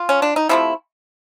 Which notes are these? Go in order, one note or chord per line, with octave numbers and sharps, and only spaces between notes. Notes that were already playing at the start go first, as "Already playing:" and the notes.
Already playing: F4
C#4
D4
D#4
C3 F3 A3 E4